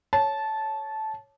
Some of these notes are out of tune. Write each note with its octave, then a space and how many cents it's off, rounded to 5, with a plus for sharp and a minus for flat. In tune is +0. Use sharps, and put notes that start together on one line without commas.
C#5 +0 A5 -15